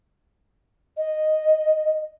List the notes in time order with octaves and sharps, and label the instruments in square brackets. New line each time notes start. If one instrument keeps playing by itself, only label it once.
[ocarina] D#5